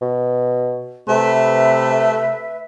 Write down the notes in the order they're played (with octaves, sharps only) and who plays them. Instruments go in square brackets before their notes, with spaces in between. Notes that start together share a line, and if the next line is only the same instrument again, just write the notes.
[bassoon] B2
[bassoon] C3 [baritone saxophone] A3 [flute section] B4 E5